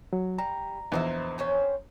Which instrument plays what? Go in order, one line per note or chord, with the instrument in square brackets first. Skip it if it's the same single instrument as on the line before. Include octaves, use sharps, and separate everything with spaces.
[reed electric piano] F#3
[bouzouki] G3 [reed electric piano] A#5
[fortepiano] A#1 E2 [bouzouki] D#4 C5 E5
[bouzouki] C#4 C5 G5